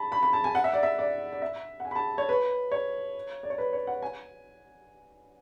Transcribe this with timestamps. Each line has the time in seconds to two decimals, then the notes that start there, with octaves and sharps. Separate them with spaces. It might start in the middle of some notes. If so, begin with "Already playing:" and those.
Already playing: A5 B5
0.12 B5
0.23 B5
0.33 A5
0.44 G#5
0.55 F#5
0.64 E5
0.73 D5
0.83 E5
0.99 D5
1.32 D5
1.42 E5
1.80 F#5
1.85 G#5
1.91 B5
1.95 A5
2.18 C#5
2.29 B4
2.72 C#5
3.43 D5
3.50 C#5
3.58 B4
3.73 C#5
3.87 F#5
4.02 G#5